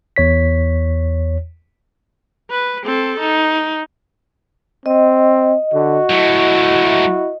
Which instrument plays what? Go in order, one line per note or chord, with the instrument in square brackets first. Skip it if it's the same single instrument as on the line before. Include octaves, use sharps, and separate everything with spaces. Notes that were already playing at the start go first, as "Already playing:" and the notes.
[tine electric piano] E2 C#5 B6
[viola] B4
C4 A4
D#4
[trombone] C4 [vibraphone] D#5
[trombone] D3 [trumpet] F#4
[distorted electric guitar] F#3 A3 [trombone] E4